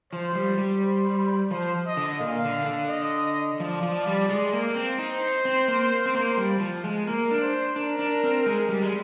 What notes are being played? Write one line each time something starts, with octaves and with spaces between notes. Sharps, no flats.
F3 C5
G3
G3
C5
F3 C5
D#5
D3
A#2 F5
D3
D3
D#5
F3 D5
F3
G3
G#3
A#3
C4
D#4 C5
C4
A#3
C4
A#3
G3
F3
G#3
A#3 A#4
D4
C5
D4 A#4
D4
C4
G#3
G3
G#3